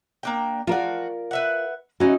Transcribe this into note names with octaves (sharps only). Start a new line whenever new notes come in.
A#3 D4 G5
F3 F4 F#4 A#4 D5
B4 E5 F#5
E3 C#4 D#4 F#4